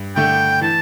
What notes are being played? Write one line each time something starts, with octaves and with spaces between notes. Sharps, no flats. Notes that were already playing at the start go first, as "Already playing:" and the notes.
Already playing: G2
D3 A3 G5
E3 A5